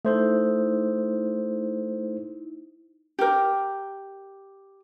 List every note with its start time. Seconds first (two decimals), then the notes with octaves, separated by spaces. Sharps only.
0.05 A3 D#4 E4 C5
3.19 G4 A#4